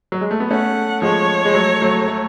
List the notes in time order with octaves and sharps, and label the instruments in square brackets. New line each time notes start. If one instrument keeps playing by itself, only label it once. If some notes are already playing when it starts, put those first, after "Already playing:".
[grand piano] F#3
G#3
A3
B3
[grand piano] A3 C#4 [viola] F#5
[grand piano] F3 G#3 [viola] C#5
[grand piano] G#3
F#3 A3
F#3 A3
A3